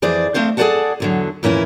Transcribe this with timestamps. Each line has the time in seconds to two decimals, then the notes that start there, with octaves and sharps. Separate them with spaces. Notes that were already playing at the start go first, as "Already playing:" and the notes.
0.02 F2 E3 G#4 C5 D5
0.34 A3 C4 C5 F5
0.57 G#4 A4 C5 D5 F#5 A5
1.00 E2 D3 F#3
1.43 F2 A#2 E3 C#4 E4